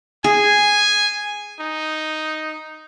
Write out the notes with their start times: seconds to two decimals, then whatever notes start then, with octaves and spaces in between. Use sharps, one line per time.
0.24 G#4 G#5
1.59 D#4